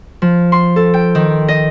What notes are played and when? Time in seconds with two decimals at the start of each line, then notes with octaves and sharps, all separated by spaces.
0.22 F3
0.52 C6
0.76 A4
0.94 G5
1.15 D#3
1.48 D#5